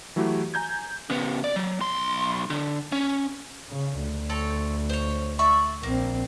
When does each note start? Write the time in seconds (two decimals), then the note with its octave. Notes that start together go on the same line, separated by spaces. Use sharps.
0.16 E3 F#3 A3 E4 F#4 G4
0.54 G#5 A#5 G6 G#6
1.10 C#3 B3
1.44 D5
1.56 F#3
1.80 B1 C6
2.50 D3
2.92 C#4
3.70 C#3
4.01 D2
4.29 C4 A4 C#5
4.90 C5 C#5
5.39 D5 E5 C#6
5.83 A#1 A#3 C4